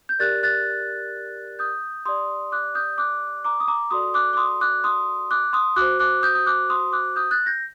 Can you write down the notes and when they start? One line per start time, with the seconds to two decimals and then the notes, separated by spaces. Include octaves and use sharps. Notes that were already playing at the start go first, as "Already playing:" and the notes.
0.09 G6
0.19 G4 A#4 D5 F#6 A6
0.43 F#6 A6
1.59 D#6 G6
2.05 G4 D5 C6 D#6
2.52 D6 F#6
2.75 D#6 G6
2.98 D6 F#6
3.44 A#5 D6
3.60 D#6
3.68 A#5 D6
3.91 F#4 A4 D5 C6 D#6
4.14 D6 F#6
4.33 D6
4.37 C6 D#6
4.61 D6 F#6
4.84 C6 D#6
5.31 D6 F#6
5.53 C6 D#6
5.76 F#4 C5 D6 F#6
5.99 D6 F#6
6.23 D#6 G6
6.35 D#6
6.46 D6 F#6
6.70 C6 D#6
6.92 D6 F#6
7.16 D#6 G6
7.31 F#6 A6
7.46 G6 A#6